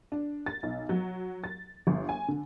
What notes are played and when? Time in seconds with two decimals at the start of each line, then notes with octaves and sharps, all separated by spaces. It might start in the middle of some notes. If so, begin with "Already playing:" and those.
0.12 D4
0.46 A6
0.63 B1
0.89 F#3
1.44 A6
1.87 G1
2.09 G#5
2.28 D3